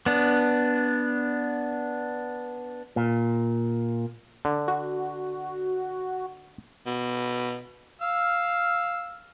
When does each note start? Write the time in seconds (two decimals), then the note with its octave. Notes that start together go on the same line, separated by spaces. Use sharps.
0.06 B3 D4
2.96 A#2
4.45 D3
4.68 F#4
6.86 B2
8.01 F5 E6 F6